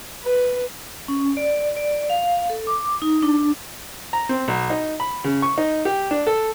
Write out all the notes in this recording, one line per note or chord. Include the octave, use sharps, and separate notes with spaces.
B4
C#4
D5
D5
F5
A4
D6
D#4
D4
A#5
C4
B1
D#4
B5
C#3
C#6
D#4
G4
D4
A4